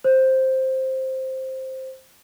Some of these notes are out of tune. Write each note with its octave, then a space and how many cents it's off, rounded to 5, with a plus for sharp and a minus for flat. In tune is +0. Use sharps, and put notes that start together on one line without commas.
C5 +5